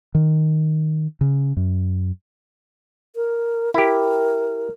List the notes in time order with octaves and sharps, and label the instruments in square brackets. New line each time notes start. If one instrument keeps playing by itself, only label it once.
[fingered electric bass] D#3
C#3
F#2
[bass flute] A#4
[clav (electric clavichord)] E4 G4 [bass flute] A#4